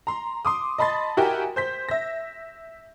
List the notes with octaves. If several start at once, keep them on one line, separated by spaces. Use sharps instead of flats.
A#5 C6
C6 D6 D#6
D#5 A5 B5 C6 A6
E4 F#4 G4 A#4 G5 G#5
C5 G6 B6
E5 A#6